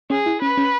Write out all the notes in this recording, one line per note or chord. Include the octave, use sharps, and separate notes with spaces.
C#4 G#4
E4
C#4 B4
C#4